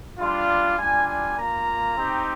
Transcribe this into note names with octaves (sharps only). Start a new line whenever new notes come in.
G3 D4 F4
G3 D4 F4 G#5
G#5
A#3 F4 A#5
C4 D#4 G4